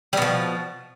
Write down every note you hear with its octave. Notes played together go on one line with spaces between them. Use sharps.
B2 F3 G3